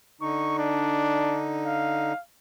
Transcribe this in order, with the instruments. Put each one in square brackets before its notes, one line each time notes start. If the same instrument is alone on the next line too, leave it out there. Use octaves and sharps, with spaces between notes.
[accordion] D3 D#4 [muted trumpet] C#6
[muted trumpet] D4
F5